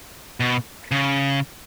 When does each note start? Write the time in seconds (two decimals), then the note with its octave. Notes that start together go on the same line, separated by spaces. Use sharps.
0.40 B2
0.91 C#3